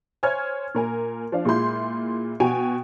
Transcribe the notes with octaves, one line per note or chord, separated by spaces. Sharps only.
C5 C#5 G#5 F6 G#6
A#2 A#4 G#5
F3 D4 F5
A#2 G#3 E4 F4 C6 G6
B2 F#4 G5 G#5 D7 F7